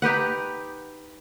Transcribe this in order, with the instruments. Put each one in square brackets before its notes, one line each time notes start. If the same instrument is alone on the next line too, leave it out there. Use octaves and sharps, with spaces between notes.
[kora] D#4 G4 B4 F#5